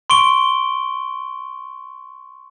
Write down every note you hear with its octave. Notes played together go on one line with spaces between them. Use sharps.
C6 C#6 D7 G7